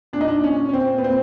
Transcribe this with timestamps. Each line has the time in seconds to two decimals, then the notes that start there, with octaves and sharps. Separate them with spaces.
0.13 A#2 D4
0.21 D#4
0.28 D4
0.43 A#2 C#4
0.69 C#4
0.73 A#2 C4
0.98 B3
1.04 A#2 C4